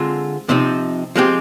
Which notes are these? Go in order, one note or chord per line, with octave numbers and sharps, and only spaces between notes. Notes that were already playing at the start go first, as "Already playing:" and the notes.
Already playing: D3 G#3 C4 F4
C3 F3 C4 D#4
F3 G#3 C4 G4